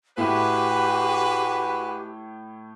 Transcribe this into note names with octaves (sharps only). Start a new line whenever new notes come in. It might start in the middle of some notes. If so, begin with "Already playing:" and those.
A2 G#3 E4 F#4 G4 B4